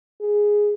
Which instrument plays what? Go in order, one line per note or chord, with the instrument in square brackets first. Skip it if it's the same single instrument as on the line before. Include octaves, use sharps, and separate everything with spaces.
[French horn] G#4